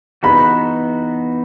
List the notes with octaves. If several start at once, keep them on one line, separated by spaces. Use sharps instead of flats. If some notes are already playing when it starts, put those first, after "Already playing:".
E3 B3 D#4 F#4 B5